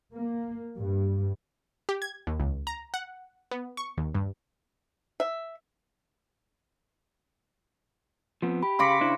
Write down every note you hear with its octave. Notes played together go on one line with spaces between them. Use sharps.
A#3
G2
G4
G#6
D#2
C#2
A#5
F#5
B3
C#6
D#2
G2
E5
F3 B3 C4
G4 B5
C#3 B5 C6 D6 A#6 C#7
D4 E4 C5